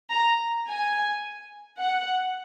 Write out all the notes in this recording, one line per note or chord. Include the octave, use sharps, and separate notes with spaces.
A#5
G#5
F#5